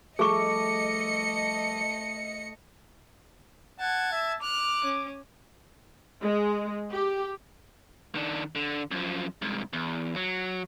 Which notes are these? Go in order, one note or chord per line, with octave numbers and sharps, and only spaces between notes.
F3 G3 A3 G#4 D#5 C#6 D6 C#7
F#5 A5 G#6
E5
D6 F6 F#6
C#4
G#3
G4
D#3 D4
D3
F#2 F3
C2 G#2
E2
F#3